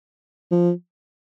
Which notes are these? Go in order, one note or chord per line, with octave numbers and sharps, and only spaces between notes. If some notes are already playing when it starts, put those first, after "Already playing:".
F3